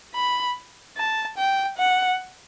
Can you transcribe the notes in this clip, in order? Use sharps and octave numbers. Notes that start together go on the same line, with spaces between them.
B5
A5
G5
F#5